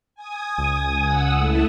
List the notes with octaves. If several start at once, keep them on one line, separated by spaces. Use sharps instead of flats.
G#5 D#6
C#2
F#5 D#6 E6
A3 E4 A4